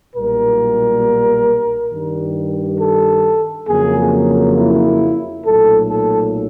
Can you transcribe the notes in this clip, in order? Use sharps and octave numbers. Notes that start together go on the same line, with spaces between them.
B1 A#2 G3 A#3 A#4
G2 D#3 G3
A4
F2 C#3 F#3 A#3 G#4
E4
B1 A#2 F#3 A3 A4
A4